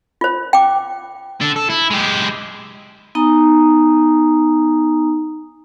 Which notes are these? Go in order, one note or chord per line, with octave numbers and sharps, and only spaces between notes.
F4 C5
G5 D6
D4 A4
A4
E4
G#3 G4
B3 D#4 G#5 A#5 D#6